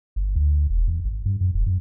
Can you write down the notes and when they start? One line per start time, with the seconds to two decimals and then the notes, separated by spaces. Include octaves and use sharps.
0.16 G1
0.36 D2
0.69 E1
0.88 E2
1.05 G#1
1.26 G2
1.41 F#2
1.54 E1
1.66 F#2